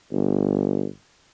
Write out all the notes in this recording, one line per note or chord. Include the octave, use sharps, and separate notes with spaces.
G1